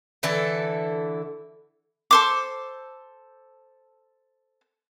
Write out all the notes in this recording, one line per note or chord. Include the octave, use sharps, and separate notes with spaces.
D3 E3 E4 A4
A4 C5 D6